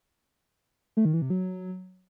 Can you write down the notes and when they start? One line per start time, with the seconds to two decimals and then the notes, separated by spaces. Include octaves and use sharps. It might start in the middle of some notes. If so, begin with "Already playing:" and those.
0.97 A3
1.05 D#3
1.13 E3
1.22 C3
1.30 F#3